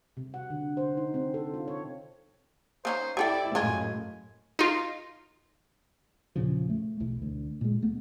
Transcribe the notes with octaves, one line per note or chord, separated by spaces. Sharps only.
C3
F#5
D3
C5
D#4
C4
A4
F4
C#5
A#3 C#4 D#4 C5
E4 G4 A4 D5 G5
F#2 A2 G#3 A#3 F4 G#5
D#4 F4
E2 A#2 C#3 F3
A3
B1 E2 E3
D2
A#2 G#3
D1 A3 B3